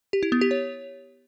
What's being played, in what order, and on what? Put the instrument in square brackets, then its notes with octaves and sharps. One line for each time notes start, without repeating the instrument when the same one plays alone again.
[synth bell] G4
E4
B3
G4
C#5